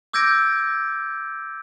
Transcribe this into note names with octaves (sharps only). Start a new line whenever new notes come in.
D6 E6 G6 G#6 A#6 D7